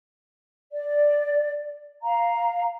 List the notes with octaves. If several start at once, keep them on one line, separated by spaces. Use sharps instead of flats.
D5
F5 A#5